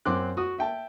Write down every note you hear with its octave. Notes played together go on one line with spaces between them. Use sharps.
F#2 C4 C6 D6 F#6
F#4 D#6
E5 G5 A5